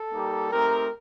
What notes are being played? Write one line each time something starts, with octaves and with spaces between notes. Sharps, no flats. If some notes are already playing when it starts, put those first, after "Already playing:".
Already playing: A4
G3 A#3 D#4 G4
A3 C4 D#4 G4 A#4